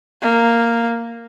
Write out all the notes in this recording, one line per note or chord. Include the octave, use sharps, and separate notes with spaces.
A#3